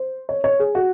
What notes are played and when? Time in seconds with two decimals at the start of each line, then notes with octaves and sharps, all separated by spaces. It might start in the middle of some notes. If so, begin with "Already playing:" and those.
Already playing: C5
0.29 C#5
0.44 C#5
0.59 G#4
0.75 F#4